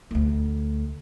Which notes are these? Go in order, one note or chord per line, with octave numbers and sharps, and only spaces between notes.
D2 A3